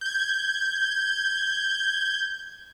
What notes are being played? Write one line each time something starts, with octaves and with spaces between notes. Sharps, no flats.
G6 G#6